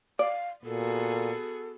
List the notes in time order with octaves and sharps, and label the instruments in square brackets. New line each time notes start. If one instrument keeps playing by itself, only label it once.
[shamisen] D5 [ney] F5
[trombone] A#2 [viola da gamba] B3 F#4 G#4 [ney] A4